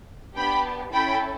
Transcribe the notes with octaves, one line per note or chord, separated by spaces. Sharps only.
B3 D4 G4 G5 B5
C#4 E4 A4 G5 B5